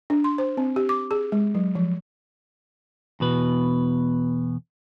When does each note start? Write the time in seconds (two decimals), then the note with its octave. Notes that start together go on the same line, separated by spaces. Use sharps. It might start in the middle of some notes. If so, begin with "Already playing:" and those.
0.10 D4
0.24 C6
0.38 C5
0.57 C4
0.76 G4
0.89 D6
1.11 G#4
1.32 G#3
1.55 F#3
1.75 F3
3.20 E2 B2 B4